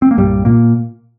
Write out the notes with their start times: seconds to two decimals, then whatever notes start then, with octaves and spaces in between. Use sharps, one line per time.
0.02 C4
0.11 A#3
0.18 C2 G2 A#2 G3
0.45 A#2 A#3